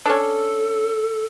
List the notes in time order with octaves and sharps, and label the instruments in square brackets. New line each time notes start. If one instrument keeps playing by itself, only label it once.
[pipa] C#4 D4 [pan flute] A4